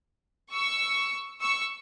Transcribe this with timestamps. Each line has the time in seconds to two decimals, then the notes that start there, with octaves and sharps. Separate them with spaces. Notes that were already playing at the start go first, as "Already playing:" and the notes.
0.51 C#6 E6
1.41 C#6 E6